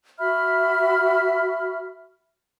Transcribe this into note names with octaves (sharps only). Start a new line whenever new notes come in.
F#4 E5 B5 F6